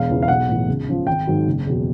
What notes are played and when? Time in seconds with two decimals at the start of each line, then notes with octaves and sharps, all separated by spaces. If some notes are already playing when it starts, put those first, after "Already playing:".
Already playing: E1 F5
0.09 E2 C#3 E3
0.22 F5
0.28 B1 F#5
0.49 A2 E3
0.68 C#2
0.88 C#3 F3
1.07 G#1 G5
1.27 G#2 D#3 F#3
1.47 F#1
1.67 E2 B2 F#3